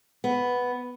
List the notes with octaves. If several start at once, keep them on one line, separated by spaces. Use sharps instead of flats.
B3